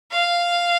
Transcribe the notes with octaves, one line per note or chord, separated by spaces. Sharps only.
F5